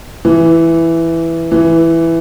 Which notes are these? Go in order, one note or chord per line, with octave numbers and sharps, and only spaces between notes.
E3
E3